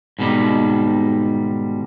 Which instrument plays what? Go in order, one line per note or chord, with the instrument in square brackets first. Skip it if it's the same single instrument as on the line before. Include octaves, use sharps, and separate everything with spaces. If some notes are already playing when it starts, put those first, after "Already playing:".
[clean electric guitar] G#2 B2 D#3 G3